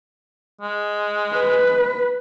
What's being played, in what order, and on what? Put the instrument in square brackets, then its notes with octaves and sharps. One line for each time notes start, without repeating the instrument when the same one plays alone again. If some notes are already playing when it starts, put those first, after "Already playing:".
[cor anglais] G#3
[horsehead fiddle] B4